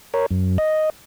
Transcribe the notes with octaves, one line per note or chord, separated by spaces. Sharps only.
A#4 C#5
F#2
D#5